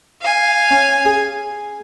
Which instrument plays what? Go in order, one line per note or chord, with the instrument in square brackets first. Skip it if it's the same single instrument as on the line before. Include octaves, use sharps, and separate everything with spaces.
[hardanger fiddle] F5 G#5
[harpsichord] C#4
G#4